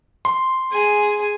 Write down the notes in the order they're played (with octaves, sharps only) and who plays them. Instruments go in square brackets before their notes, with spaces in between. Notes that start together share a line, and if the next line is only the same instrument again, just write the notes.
[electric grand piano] C6
[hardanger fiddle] G#4 G#5